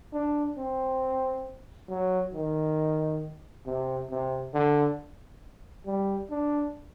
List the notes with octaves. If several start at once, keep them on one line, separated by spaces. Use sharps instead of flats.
D4
C4
F#3
D#3
C3
C3
D3
G3
D4